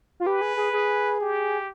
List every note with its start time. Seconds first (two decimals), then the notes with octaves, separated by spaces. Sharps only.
0.20 F4
0.26 G4 B4
0.41 G#4
0.57 G#4
0.73 G#4
1.20 G4